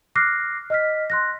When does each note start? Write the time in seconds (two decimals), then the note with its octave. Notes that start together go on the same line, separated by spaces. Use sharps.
0.15 D6 F6 F#6 A#6 C7
0.70 D#5 F6 B6
1.10 C6 F#6 A#6